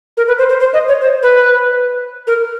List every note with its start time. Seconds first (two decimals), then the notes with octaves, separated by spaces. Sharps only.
0.17 A#4
0.28 B4
0.38 C5
0.49 C5
0.60 C5
0.73 D#5
0.88 C#5
1.01 C5
1.23 B4
2.27 A#4